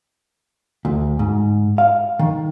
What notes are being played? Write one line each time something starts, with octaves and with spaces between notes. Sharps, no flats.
D2
G#2
F5
D#3